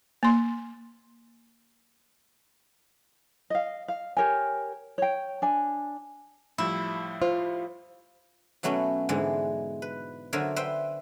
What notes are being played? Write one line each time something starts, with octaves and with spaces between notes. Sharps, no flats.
A#3 C6
D#5 F5
F5
G4 A#4 C#5 G#5
C#5 G5
D4 G#5
A2 F3 G3 E4
F4 C5
B2 F#3 A3 B3 C#4
G#2 D3 E3 G#3
B4
D3 F#3 A#4 C5 E5 G#5
B4 C5 E5 G5